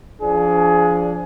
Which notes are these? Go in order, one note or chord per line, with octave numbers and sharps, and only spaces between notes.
F3 D4 G#4